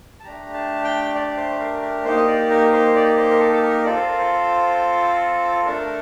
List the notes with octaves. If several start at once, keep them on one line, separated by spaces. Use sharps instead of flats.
A5
A3 D4 G4 A#5
A5
G5
D5
C5
A#4
A#4
A#3 D#4 G4 C5
D#5
D5
A#4
C5
D5
C5
A#4
A4
A4
A#4
C4 F4 A4 D5
C5
A#4
C5
A3 D4 A4 A#4